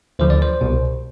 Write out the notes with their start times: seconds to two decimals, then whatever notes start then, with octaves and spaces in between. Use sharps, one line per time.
0.19 D2 D3 F3 C5
0.30 D5
0.42 C5
0.61 C2 B2